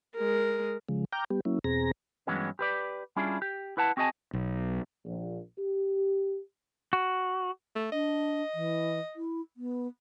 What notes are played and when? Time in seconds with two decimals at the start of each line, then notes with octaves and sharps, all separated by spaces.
0.16 G#3 A#4
0.89 C#3 F3 G#3
1.13 G5 A#5 D6 F6 G6
1.30 G3 B3 G4
1.45 F#3 A#3 C#4 E4
1.64 E2 B2 C4 G#4 A#5 A#6
2.27 G2 E3 F#3 G#3 B3 C#4
2.59 G4 B4 D5
3.16 G3 C#4 D4 E4 F4 G#4
3.42 G4
3.77 E4 B4 F#5 A5
3.97 C4 F#4 G#4 D#5 G#5 A5
4.33 B1
5.05 A#1
5.58 G4
6.93 F#4
7.75 A3
7.92 D4 D#5
8.54 E3
9.16 E4
9.57 B3